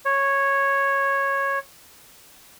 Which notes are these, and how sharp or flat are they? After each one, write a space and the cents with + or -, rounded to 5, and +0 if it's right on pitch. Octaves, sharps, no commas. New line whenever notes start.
C#5 -10